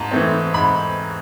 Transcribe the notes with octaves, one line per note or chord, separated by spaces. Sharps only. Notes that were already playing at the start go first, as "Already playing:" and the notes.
Already playing: G#2 A5 A#5
E3 A3 C4
G#2 B5